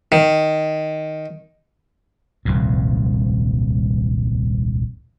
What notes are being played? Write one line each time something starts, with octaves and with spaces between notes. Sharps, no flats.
D#3
D#1 C2 F2 G#2